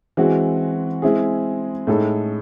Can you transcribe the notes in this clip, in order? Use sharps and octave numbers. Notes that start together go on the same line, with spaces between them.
E3 G#3 C4 F#4
G#3 C4 E4 G#4
A2 G#3 D#4 A4